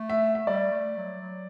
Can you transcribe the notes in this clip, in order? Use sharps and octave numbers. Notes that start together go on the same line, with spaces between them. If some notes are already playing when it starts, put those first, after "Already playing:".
Already playing: A3
E5
E5
G3 D5
A3
F#3
F#3